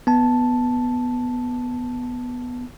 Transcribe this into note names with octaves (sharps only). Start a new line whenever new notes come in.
B3 A5